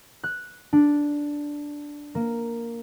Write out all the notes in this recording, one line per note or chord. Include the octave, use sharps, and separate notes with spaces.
F#6
D4
A#3